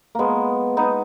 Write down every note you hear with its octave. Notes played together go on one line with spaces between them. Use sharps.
G#3 A#3 B3
B3 D#4